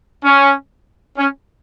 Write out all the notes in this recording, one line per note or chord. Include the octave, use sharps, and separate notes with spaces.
C#4
C#4